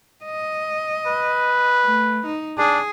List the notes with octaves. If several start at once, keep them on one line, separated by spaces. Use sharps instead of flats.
D#5
B4
A3
D#4
D4 G#4